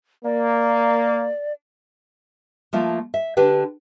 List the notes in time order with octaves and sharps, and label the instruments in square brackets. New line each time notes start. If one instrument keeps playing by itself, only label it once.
[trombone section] A#3 [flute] D5
[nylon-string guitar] F3 A3 A#3 F4
E5
D3 D4 G4 B4 G5